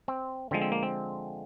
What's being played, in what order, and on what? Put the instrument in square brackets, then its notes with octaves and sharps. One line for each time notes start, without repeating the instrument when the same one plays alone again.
[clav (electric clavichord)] C4
D3 F3 G#3 C4
C4
A#3
C4